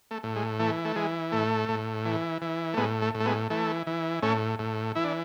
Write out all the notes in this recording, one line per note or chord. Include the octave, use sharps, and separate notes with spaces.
A3
A2
G#3
E3 A3
A3
E3 G#3
A2 A3
A2
E3
E3
A3
A2 G#3 B3
A3
A2
A3
G#3 B3
E3 A3
E3
A2 A3 C#4
A2
E3 E4
D4